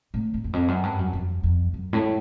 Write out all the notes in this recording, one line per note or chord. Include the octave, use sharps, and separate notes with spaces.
A2
E2
E2
F2
F#2
G2
F#2
F2
F2
F#2
A2